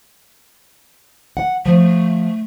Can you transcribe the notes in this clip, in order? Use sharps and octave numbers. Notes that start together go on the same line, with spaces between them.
F#5
F3 A3